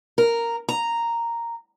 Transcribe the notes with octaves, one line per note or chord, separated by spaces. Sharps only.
A#4
A#5